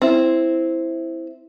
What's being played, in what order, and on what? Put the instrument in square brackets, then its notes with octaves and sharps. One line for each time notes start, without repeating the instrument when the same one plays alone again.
[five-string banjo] C4 E4